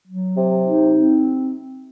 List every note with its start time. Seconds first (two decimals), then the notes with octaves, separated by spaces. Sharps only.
0.07 F#3
0.36 C3
0.65 D#4
0.94 C4